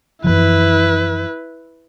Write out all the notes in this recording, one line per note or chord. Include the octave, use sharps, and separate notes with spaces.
F#2 E3 F3 E4 B4